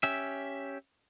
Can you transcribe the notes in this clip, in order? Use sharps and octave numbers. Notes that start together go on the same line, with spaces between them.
C#4 G4 E5